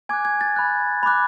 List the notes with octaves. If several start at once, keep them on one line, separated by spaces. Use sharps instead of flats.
G#5 D6 F#6 G#6
G#6
A6
B5 F#6
B5 D6 F#6